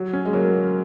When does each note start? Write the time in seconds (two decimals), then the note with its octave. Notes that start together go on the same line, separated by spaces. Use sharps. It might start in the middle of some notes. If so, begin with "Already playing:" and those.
Already playing: F#3
0.13 C#4
0.25 G#3
0.33 F#3 A#3